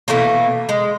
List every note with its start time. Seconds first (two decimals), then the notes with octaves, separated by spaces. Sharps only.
0.08 B2 E3 A3 A#3
0.69 G#3